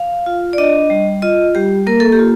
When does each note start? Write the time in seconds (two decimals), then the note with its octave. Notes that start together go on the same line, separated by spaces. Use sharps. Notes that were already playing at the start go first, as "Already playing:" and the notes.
Already playing: F5
0.26 F4
0.53 D5
0.58 D4 D#5
0.90 G3
1.22 F4 D#5
1.55 G3 G4
1.87 A#3 A#4
2.00 A4
2.12 G4
2.19 F4